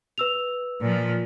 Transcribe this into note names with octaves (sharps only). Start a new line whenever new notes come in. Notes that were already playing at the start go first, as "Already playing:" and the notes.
B4 E6 F7
A#2 F3